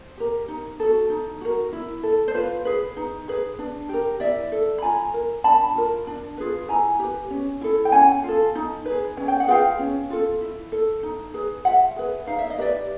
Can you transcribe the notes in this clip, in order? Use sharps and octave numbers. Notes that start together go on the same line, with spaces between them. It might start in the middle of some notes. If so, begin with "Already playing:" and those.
Already playing: C5
G4 A#4
D#4
F#4 A4
D#4
F#4 A#4
E4
A4
C5
F4 B4
G#4 B4
D#4
G#4 B4
D4
G4 A#4
E4 D5 E5
A4
B5
F4 G#5 A#5
A#4
D4 A5 B5
F4 A#4
D4
F4 G#4 B4
E4 G#5 A#5
G4 B4
C#4
E4 A4
G5
C#4 F#5 G#5
F4 A4
D#4
G#4 B4
C#4 G#5
G5
F#5
F4 G#4 B4 F5 G5
C#4
F4 A4
E4
A4
D#4
G#4 B4
F4 E5 F#5
G#4 B4
D#4 F5
E5
D#5
G4 B4 D5 E5